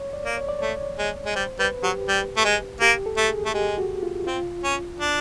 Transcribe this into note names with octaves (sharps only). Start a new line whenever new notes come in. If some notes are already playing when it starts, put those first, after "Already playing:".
Already playing: C#5
D5
A#3
C#5
D5
A3 C#5
G#3
G#3
G3 C5
G3 B4
F#3 G4
G3
A3
G#3
A#3 G4
A4
A3
G#4
A3
G#3 G4
F#4
F4
C4 F4
C#4
D4